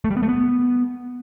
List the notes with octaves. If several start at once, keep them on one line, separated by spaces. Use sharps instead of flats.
A3
G3
B3
A3
B3